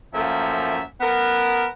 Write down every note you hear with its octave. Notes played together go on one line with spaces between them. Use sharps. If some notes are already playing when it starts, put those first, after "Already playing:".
F#2 F3 A3 A#3 E5
B3 A#4